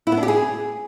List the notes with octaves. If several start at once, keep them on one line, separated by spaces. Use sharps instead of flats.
E4
B3
D4
G4
G#4